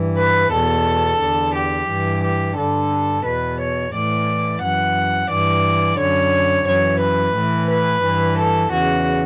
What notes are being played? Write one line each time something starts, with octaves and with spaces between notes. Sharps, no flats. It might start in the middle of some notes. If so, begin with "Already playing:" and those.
Already playing: G2 E3
B4
E2 B2 A4
E2 D3
G4
G2 E3
G4
G2 D3 A4
E2 B2 B4
C#5
A2 E3 D5
F#2 E3 F#5
G2 E3 D5
F#2 D3 C#5
F#2 E3 C#5
B4
A2 E3
B4
G2 E3
A4
E2 C#3 E3 F#4